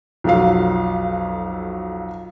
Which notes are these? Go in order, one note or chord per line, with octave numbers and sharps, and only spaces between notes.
B1 F2 F#3 F5